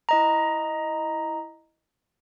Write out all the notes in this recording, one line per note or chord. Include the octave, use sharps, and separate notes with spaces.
E4 D#5 A#5